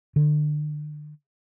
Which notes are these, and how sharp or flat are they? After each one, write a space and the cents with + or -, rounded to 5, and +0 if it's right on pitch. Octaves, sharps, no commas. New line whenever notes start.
D3 +35